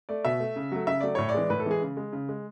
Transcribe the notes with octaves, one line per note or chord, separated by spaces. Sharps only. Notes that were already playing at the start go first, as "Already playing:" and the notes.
A3 D5
B2 E5
A3
C#3
F#3 A3
C#3 E5
F#3 A3 D5
A2 C#5
D5
E3 G#3
A2 B4
A4
E3 G#3 G#4
C#3
G#3
C#3
G#3